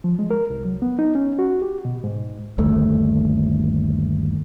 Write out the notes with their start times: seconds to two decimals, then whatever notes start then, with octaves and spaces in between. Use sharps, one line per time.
0.04 F3
0.19 G#3
0.31 A#4
0.50 C2
0.65 F#3
0.82 B3
0.99 D#4
1.15 C#4
1.39 F#4
1.62 G4
1.85 B2
2.04 G#2
2.58 G1 D#2 A3